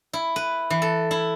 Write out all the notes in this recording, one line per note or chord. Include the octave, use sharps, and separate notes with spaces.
E4
B4
E3
A4
E4